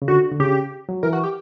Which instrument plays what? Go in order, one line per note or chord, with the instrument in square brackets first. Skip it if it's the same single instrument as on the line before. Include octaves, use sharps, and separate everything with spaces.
[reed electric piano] C#3
[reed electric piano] D3 [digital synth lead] F#4
[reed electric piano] D3
[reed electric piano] C#3 [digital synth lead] G4
[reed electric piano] F#3
[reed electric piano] E3 [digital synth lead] A#4
[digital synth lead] F#4
G4